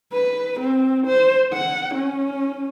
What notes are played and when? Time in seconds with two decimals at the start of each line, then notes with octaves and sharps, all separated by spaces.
0.13 B4
0.60 C4
1.06 C5
1.53 F#5
1.94 C#4